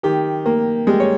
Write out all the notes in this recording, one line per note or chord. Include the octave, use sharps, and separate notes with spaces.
D#3 G4
A#3
G3 G#3 G#4
C#5